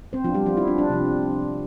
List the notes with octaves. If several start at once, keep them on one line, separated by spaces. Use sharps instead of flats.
C4 C5
F3 B3 D4 F4
G3 G4
F3 F4
E4
D4
D4
C3 F3 C4